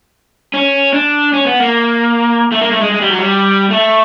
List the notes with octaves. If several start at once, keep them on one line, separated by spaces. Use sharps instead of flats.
C#4
D4
C#4
B3
A#3
A3
A#3
A3
G#3
G#3
G3
F#3
G3
A3